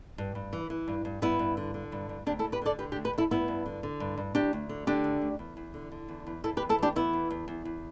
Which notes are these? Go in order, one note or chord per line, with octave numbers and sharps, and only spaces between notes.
G2
G2
E3
E3
G2
G2
G2 B3 E4
G2
D3
D3
G2
G2
D2 D4 G4
E4 A4
D2
G4 B4
D3 A4 D5
D3 G4 B4
D4 G4
D2
G4 B4
D2 E4 A4
G2 B3 E4
G2
D3
D3
G2
G2
D2 D4 G4
D2
D3
D3 D4 G4
D2
D2
E2
E2
D3
D3
E2
E2
E2 E4 A4
G4 B4
E2
E4 A4
E3 D4 G4
E3 B3 E4
E2
E2
E2
E2